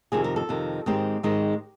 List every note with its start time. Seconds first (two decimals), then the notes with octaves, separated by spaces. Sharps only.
0.12 F2 C3 D#3 G#4
0.24 A#4
0.36 A4
0.49 F2 C3 D#3
0.86 G#2 D#3 G#3 C4 D#4 G4
1.23 G#2 D#3 G#3 C4 D#4